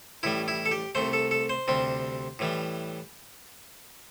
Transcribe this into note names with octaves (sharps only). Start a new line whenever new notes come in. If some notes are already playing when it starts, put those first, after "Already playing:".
A1 A2 G3 E4
E4
A4
G4
C2 C3 A3 C5
A4
A4
C5
D2 C3 G3 C4
A2 E3 G3